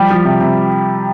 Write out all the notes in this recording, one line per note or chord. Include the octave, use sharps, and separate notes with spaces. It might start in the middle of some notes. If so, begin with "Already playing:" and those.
Already playing: F3 G3 G4
F3
C3
C3